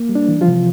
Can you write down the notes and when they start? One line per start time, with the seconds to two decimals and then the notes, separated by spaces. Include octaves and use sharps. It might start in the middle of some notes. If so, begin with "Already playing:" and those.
Already playing: A#3
0.09 G3
0.15 D4
0.28 E3
0.41 F3 F4
0.48 C3